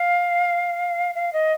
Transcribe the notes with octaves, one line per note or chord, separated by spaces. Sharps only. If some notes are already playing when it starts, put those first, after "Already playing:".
Already playing: F5
F5
D#5